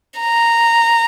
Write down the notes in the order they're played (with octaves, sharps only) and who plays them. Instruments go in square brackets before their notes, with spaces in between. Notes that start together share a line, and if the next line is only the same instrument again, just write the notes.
[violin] A#5